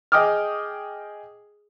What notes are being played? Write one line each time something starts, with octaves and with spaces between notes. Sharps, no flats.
G#4 D#5 G5 D6 D#6 F6